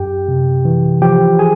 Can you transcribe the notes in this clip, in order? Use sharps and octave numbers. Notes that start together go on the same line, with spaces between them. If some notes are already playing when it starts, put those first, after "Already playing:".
Already playing: F#2 G4 G5
C3
E3
F3 G4 G5
G#4 G#5